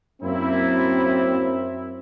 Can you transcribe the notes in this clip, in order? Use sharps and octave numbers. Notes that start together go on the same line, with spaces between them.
F#2 A#3 C4 E4